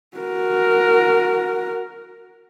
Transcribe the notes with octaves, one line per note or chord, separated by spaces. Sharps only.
F#4 A#4